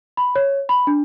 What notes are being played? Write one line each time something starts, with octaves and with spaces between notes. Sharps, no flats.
B5
C#5
B5
D4